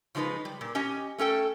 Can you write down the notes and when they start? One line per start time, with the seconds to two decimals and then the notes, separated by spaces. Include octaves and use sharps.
0.15 C#3 F3 G#3 D#4 B4
0.45 G3
0.61 A#2
0.75 C#4 G4 D#5 G#5
1.18 A3 C#4 A4 G5